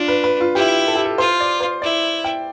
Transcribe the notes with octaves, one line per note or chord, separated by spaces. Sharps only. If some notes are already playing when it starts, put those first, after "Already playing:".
Already playing: D4 F4
B4
B4
F4
E4 G4
A4
G4
A4
F4 C5
D5
C5
E4 D5
G5